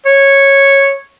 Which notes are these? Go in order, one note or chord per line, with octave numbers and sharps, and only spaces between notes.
C#5